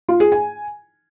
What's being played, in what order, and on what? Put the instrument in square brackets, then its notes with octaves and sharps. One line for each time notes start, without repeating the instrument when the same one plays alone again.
[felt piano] F4
G#4
G#5